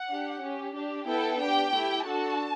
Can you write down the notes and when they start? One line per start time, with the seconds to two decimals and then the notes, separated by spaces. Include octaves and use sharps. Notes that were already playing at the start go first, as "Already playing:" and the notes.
Already playing: F#5
0.09 D4 G4
0.42 C#4 G4
0.74 D4 G4
1.07 B3 E4 A4 G5
1.40 D4 G4 G5
1.72 A3 E4 G4
2.06 D4 F#4 A4 A5